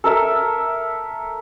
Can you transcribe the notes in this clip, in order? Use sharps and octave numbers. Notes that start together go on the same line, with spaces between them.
A4 A#4 E5